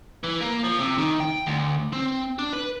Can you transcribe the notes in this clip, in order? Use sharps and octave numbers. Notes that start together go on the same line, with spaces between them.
E3
A#3
F3
C3
D#3
G5
D2
C4
D4
B4